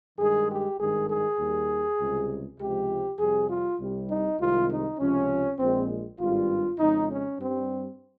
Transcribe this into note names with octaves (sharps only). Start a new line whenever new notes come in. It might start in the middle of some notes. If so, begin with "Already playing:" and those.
G2 D#3 G#3 G#4
G4
G#1 G2 D#3 G#3 G#4
G#4
D#2 D#3 G3
C#2 C3 G3
C#2 C3 F3 G#3 G4
F2 C3 G3 G#4
F4
C2 C3 G3
D#4
C2 C3 D#3 G#3 F4
D#4
C#2 C3 F3 C#4
A#1 A#2 G#3 C4
G#1 G2 G3 F4
F2 C#3 G#3 D#4
C#4
G2 G3 C4